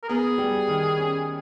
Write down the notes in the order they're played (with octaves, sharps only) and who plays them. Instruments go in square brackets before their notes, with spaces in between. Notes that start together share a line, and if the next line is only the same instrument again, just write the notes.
[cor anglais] A#4
[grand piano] B3 [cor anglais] G#4
[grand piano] G3
D#3
C#4